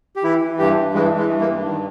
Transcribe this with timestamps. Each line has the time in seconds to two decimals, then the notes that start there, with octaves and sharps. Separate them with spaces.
0.16 G4
0.23 E3 E4
0.41 E3
0.58 G2 G4
0.76 G2
0.94 E3 G#3
1.11 E3
1.18 G#3
1.29 G2
1.41 A#3
1.46 G2
1.64 D#3